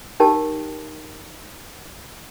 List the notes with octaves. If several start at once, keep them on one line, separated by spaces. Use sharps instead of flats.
D#4 G4 A#4 G5 A5